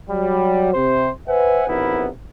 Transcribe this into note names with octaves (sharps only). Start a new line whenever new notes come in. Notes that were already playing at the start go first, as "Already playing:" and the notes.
F#3 G3
C3 C5
B4 C5 E5 F#5 G#5
B1 C3 B3 E4 A#4